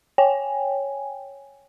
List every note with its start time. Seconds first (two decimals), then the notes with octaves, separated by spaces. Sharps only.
0.18 C#5 G5 G#5